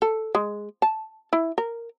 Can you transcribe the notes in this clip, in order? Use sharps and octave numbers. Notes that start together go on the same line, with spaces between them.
A4
G#3
A5
E4
A#4